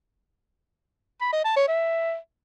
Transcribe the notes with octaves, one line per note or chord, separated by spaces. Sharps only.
B5
D#5
A5
C#5
E5